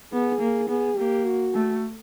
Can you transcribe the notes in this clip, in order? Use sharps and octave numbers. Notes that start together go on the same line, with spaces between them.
B3 G#4
A#3
B3 G#4
A#3 G4
F#4
A3